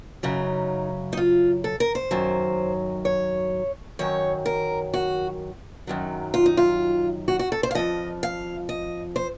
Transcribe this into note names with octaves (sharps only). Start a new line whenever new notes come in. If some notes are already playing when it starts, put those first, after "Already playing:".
F#2 C#3 F#3 D#4
D#4
F4
A4
A#4
C5
F#2 D#3 F#3
C#5
F#2 D#3 F#3 C#5
A#4
F#4
F#2 D#3 F#3
F4
D#4
F4
F#4
F#4
A4
C5
F5
F2 C#3 F3 D#5
F5
D#5
C5